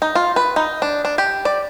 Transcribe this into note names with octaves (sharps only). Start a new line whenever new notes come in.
D#4
F4
B4
D#4
D4
D4
G4
D5